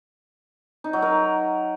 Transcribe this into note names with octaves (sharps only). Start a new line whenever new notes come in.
D#4
F#3
A#4